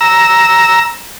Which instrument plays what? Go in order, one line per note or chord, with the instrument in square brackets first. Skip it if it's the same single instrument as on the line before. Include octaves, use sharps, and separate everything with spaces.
[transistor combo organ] A#5 E6